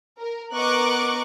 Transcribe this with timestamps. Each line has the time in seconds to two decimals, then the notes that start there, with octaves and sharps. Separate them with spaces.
0.20 A#4
0.55 B3 A#4 D#5 C#6 D6 F#6